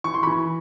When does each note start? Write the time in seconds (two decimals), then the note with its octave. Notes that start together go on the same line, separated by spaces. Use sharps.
0.04 E3 C#6
0.14 C6
0.23 B5 C#6
0.27 E3